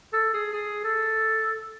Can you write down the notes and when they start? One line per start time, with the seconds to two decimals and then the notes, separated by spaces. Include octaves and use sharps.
0.13 A4
0.34 G#4
0.53 G#4
0.84 A4